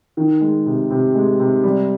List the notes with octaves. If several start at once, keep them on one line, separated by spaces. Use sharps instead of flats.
D#3
G#3
C3
C3
G#3
C3
G3